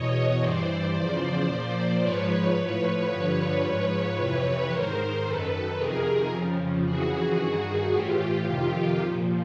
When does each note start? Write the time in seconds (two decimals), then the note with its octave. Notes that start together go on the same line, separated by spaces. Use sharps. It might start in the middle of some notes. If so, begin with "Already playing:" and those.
Already playing: E2 B2 C#5 D#5
0.40 G2 E3 C5 D5
0.93 E2 C#3 F3
1.47 A#2 F3
2.01 G#2 F3 B4 C#5
2.54 A2 F3 B4 C#5
3.09 G2 D3 F3
3.62 G#2 F3
4.15 F2 C3 E3 B4 C#5
4.69 G#2 D#3 A#4 C5
5.22 F#2 D#3 A4 B4
5.77 F2 C3 D#3 G#4 A#4
6.30 F2 C#3 F3
6.84 F2 C#3 E3 F#4 G#4
7.38 G2 D#3
7.91 A2 E3 F4 G4
8.45 F2 C3 D#3 F4 G4
8.98 A#2 F3